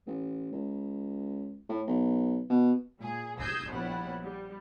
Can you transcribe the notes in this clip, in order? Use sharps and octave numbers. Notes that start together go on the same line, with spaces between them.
A1
C#2
A2
B1
B2
A#2 G#4
D#6 E6 G6 G#6 A#6 C7
A#1 G3 B3 E4 C#5 F#5
G3